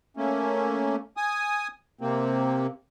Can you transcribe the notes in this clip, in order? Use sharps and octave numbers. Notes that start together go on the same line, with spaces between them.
A3 A#3 C#4
G#5 D#6
C3 A#3 C4